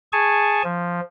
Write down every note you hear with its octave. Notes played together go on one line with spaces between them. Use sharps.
G#4 G#5 A5 C#6
F3